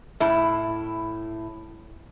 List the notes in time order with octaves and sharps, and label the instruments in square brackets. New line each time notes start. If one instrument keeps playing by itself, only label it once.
[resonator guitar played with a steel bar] A2 E4